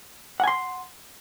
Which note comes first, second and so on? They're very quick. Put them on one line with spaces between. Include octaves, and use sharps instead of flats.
F#5 G#5 C6